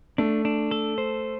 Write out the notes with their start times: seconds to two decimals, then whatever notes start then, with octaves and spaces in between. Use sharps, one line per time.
0.18 A3 D4
0.45 D4
0.71 A4
0.98 C5